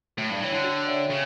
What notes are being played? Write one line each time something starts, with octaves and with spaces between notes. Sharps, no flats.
A2 F#4
G2
E3 C#5 E5 G5
D3
F#4
C#5 E5 G5
C#3